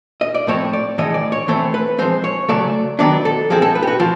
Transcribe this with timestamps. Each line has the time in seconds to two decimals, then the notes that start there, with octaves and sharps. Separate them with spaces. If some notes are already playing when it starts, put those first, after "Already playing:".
0.21 D#5
0.34 D5
0.47 A2 F3 A3 C4 C#5
0.73 D5
0.98 A2 E3 G#3 D#5
1.14 D5
1.32 C#5
1.48 E3 A3 C4 C5
1.74 B4
1.98 F3 G#3 C4 C5
2.24 C#5
2.49 C#3 F#3 A3 D5
2.99 D#3 F#3 B3 D4 D5
3.25 A4
3.50 F3 G#3 C4 G#4
3.62 A4
3.75 B4
3.83 G4
3.87 F#4
4.00 F3 F4